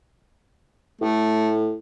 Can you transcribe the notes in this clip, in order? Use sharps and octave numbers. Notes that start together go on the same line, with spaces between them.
A2 A3